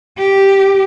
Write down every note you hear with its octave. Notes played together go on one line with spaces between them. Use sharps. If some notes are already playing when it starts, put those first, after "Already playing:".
G4